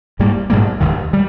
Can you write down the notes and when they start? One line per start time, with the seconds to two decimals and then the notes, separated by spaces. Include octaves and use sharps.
0.19 G#2 G3 A#3
0.50 A#1 G#2 G3 A#3
0.80 F1 D#2 D#3
1.13 G3